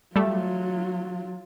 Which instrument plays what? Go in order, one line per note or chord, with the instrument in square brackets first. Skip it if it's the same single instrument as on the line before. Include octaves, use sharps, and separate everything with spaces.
[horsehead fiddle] F#3 F4 [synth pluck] G3 A3